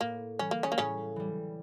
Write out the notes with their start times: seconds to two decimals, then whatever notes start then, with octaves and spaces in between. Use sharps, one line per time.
0.01 A2 A#3
0.39 E3 G3 C#4
0.51 A#3
0.63 C#3 C#4
0.72 A#3
0.78 A2 C#3 C#4
1.16 E3 G3